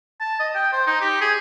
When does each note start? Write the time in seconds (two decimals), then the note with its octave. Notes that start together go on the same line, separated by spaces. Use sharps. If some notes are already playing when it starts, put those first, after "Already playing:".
0.20 A5
0.39 D#5
0.55 G5
0.72 C5
0.86 D#4
1.01 G4
1.21 G#4